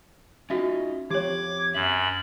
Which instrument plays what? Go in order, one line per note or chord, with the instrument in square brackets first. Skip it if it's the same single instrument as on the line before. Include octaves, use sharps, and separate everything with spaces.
[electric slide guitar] C#4 D#4 F4 [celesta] F#4 E5
[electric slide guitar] F3 C4 [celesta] G4 C#5 [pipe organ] D6 [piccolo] G#6
[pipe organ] F#2 [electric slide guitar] E5 [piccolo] F#7